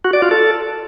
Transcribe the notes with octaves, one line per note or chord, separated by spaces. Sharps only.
F#4
D5
F4
A4